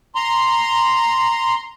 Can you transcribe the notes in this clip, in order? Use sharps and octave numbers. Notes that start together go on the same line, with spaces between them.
A#5 C6